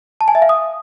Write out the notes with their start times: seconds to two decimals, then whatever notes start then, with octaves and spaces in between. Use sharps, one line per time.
0.21 A5
0.28 G#5
0.35 E5
0.42 F5
0.49 D#6